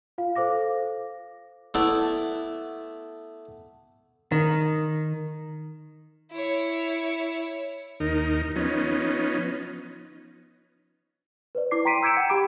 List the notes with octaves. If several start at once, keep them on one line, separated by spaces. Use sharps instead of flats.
F4 F5
A4 C5 F5 D6 A#6
A3 B3 E4 D5
D#3
E4 C#5
D#2 D#4 A#4
F3 B3 C#4 D#4
B4 C5 D5
E4 D6 C7
G5 A#5 C6 B6 D7 D#7
E6 G6 G#6 C#7 D7 E7
F#5 G5
G4 B5 D6 D7